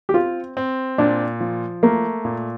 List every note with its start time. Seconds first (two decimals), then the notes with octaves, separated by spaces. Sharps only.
0.09 G4
0.14 C4 F4
0.57 C4
0.98 A#2 D4
1.41 F3
1.83 A3 A#3
2.25 A#2